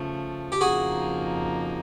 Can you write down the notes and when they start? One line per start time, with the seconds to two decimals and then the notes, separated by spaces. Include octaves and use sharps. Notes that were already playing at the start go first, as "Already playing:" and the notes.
Already playing: C#3 F3 A3
0.52 G4
0.61 F2 C#3 F3 A#3 D#4 F#4 G#4